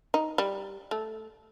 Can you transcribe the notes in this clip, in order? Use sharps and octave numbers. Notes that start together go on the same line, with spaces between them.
D#4
G3
A3